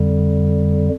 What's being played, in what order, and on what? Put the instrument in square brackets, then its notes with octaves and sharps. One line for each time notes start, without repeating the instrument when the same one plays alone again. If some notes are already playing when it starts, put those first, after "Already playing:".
Already playing: [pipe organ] F2 D3 G3